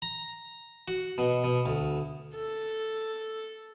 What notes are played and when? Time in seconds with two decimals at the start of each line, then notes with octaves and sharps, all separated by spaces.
0.02 A#5
0.88 F#4
1.18 B2
1.44 B2
1.66 D2
2.36 A4